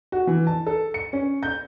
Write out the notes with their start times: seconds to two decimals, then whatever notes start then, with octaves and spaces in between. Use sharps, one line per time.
0.12 F#4
0.27 E3
0.47 A5
0.66 A4
0.94 C#7
1.13 C#4
1.43 G6